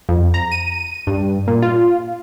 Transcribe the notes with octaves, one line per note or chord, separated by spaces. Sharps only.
F2
A#5
D#7
G2
A#2
F4